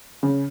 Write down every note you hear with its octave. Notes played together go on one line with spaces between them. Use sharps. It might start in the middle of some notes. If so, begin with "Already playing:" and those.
C#3